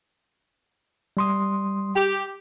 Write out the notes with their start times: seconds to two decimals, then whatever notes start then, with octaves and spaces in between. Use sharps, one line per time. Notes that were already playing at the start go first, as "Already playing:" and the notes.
1.17 G3 C6 D#6
1.95 G4